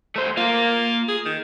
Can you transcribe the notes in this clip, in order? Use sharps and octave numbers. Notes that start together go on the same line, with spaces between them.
A3 C5
A#3 F4 A#4
G#4
D#3